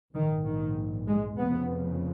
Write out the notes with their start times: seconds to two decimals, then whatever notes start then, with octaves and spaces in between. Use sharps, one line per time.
0.14 A#1 G#2 D#3
0.45 D#3
1.07 G#3
1.38 F1 F2 C#3 B3